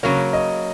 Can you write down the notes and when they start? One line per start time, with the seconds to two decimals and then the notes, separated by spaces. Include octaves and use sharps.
0.03 C#3 F#3 A#3 C#5
0.33 D#5